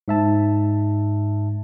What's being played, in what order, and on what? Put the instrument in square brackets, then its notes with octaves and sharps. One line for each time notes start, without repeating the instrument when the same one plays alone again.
[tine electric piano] G#2 E5 A5